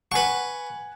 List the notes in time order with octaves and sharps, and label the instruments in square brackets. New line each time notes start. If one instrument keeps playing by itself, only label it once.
[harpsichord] B4 C#6 [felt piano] F#5 G#5